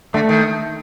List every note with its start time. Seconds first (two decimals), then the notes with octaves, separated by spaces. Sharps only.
0.14 D3 A3
0.29 D#3